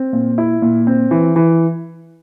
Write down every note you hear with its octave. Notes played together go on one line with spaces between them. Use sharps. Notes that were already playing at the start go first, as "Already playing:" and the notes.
Already playing: C4
A#2
E4
A#2
C4
E3
E3